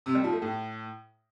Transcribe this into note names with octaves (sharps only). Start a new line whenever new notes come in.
C3
G3
F3
A3
A2